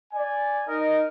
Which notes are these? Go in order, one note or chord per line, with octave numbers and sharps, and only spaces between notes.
D5 G#5
D#4 A#4 D#5